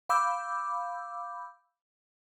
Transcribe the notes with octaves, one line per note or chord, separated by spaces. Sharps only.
F5 B5 D6 E6 G6